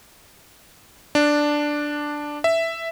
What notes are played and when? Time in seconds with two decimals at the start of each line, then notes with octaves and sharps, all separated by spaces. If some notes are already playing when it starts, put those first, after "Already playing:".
1.15 D4
2.44 E5